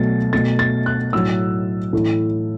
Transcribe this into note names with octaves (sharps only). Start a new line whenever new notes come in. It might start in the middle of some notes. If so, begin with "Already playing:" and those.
Already playing: B2 F#3 A3 A6
B2 A3 A6
A6
F#6
A2 F#3 A3 E6
A2 E3 A3